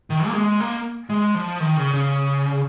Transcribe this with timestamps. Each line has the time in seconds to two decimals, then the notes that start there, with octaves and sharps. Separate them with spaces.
0.10 D#3
0.27 A#3
0.34 G#3
0.60 A#3
1.10 G#3
1.35 F3
1.60 D#3
1.77 C#3
1.94 C#3